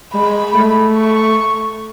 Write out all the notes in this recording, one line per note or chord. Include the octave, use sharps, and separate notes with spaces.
G#3 B5
A3
C#6